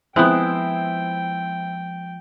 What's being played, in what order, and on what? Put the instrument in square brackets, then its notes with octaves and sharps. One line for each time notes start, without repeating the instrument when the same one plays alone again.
[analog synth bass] F3 [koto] G#3 B3 [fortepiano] C4 E4 [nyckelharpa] G5